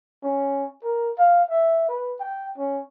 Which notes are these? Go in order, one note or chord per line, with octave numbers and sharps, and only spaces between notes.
C#4
A#4
F5
E5
B4
G5
C#4